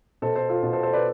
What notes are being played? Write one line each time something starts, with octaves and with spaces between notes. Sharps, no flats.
B2 A4 C5
A4 C5
F4 A4
B2
A4 C5
A4 C5
B4 D5